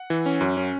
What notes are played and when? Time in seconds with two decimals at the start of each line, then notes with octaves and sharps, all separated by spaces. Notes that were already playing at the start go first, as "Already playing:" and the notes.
Already playing: F#5
0.10 E3
0.26 C#4
0.41 F#2
0.57 C#4